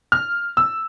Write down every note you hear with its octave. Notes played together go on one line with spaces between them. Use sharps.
F6
E6